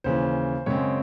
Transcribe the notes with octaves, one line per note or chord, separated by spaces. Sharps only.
D#2 C#3 E3 C5
F#2 C#3 G#3 C4 C#5